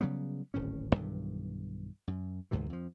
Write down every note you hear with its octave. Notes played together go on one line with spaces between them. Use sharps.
C#3 F#3 G3 B3
D1 G#1 A2 C#4
B1 G2 D#3 E3
F#2
D2 G#2 C3 E3
F2 F3